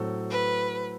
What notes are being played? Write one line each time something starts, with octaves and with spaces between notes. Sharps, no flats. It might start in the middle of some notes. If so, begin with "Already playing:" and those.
Already playing: A2 F#3 C4 F#4 A4
B4